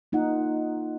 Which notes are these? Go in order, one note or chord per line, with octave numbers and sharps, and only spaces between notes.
A#3 D#4 F4 F#5